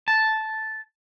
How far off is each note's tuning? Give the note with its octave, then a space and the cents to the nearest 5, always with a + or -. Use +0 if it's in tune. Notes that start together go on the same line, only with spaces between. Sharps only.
A5 -5